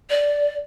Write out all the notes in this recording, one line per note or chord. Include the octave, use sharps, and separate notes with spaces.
D5